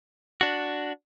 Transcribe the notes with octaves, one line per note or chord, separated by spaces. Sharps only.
D4 F#4